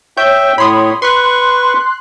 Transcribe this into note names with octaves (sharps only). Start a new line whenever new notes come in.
C#5 E5 G5 G6
A2 C#5 B5 C6 D#6
B4 C6 C#6 F#6